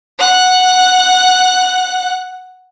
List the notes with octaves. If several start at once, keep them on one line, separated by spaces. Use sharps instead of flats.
F#5 F#6